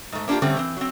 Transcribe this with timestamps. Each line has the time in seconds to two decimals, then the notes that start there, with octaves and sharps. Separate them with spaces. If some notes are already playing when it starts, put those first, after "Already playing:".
0.12 G#2 A3
0.28 A#3 C#4 D4 F4 G4
0.42 D3 G3 A3 C4 C#4
0.57 E3 C4
0.77 F#3 C4